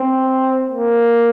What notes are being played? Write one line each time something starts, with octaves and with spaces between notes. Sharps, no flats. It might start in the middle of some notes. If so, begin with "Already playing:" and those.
Already playing: C4
A#3